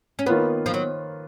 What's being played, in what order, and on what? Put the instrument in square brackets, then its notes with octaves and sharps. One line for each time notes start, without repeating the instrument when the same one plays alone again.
[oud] C#4
[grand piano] D#3 A#3 F4 B4 [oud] B3
[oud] F3
F#3